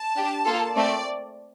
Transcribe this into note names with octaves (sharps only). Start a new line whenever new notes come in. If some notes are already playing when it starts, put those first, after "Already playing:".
Already playing: A5
D4 G4
A#3 F4 A4
A3 C4 D5